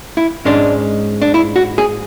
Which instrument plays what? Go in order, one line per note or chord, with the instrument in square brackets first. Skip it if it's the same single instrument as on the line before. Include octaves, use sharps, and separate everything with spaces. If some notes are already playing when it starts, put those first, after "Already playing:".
[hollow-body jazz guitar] E4
G#2 G#3 C#4 D4
D4
E4
F#4
G#4